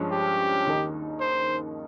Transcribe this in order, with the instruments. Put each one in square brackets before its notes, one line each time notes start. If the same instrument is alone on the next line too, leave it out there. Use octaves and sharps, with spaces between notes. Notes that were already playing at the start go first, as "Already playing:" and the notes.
Already playing: [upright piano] G2 F3 G#3 C#4
[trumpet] G4
[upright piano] D#2 D#3 A#3 D#4
[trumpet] C5